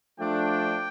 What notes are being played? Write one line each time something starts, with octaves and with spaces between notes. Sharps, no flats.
F3 A3 D4 G5